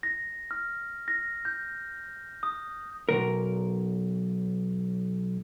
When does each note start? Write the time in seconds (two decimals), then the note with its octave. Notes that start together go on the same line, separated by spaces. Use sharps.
0.03 A#6
0.51 F6
1.08 A#6
1.45 G6
2.43 D#6
3.09 B1 A#2 A#4